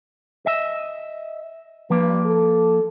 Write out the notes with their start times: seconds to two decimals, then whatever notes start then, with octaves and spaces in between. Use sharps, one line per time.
0.46 D#5 E5
1.90 G2 F3 A#3 B4
2.25 A4